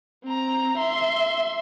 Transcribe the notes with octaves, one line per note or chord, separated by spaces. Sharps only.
C4 A#5
E5 C6